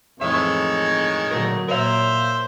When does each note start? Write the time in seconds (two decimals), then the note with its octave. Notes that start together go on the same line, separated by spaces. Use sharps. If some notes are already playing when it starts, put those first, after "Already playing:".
0.21 F2 A2 D#3 E3 G#3 C#5 E5
1.31 A#2 D3 F#3 A3 A#4
1.68 A#2 A#4 C5 C#5 E5 F5